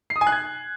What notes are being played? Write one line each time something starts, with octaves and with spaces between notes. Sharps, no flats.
C7
D#6
G#5
F#6
G#6